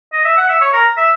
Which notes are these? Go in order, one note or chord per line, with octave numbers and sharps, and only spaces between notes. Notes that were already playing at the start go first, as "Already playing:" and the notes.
D#5
E5
F#5
E5
C#5
A#4
E5